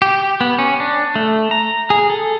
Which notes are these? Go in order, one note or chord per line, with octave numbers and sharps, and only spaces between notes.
G4
B3
C#4
D4
A3
A#5
G#4
A4